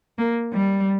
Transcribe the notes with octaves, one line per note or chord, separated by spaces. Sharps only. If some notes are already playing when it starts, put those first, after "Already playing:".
A#3
G3